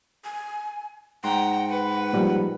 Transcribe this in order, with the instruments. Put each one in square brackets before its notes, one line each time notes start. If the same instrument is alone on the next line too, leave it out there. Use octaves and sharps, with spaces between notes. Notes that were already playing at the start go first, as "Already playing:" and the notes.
[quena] G#5
[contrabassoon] G#2 [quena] F#5 [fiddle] G5 A#5 [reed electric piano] C6
[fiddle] B4
[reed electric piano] A#2 F3 G3